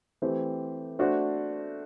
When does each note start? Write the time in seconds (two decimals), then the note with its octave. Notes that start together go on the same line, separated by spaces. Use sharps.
0.22 E3 A3 C4 G4 C5
0.99 A3 D4 F#4 C5